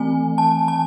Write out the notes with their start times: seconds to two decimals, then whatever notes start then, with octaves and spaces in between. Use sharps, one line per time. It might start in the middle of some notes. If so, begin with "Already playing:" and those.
Already playing: E3 A3 C4 G#5
0.38 A5
0.68 A5